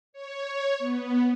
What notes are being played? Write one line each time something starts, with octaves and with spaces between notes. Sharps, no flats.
C#5
B3